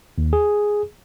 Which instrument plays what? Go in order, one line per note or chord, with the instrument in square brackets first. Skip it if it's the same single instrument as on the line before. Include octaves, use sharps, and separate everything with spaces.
[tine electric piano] D#2
G#4